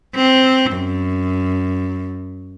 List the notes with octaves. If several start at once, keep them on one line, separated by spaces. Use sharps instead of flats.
C4
F#2